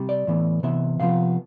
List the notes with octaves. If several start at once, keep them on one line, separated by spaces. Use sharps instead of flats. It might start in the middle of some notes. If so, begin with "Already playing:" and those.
Already playing: C3 G3
D5
A2 E3 B3
C3 E3 B3 E5
C3 F3 B3 F5